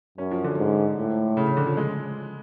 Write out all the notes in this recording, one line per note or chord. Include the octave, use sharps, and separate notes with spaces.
F#2 C#4
F3
D3
G#2
A2
C#3
C#3
D3
F3
G#3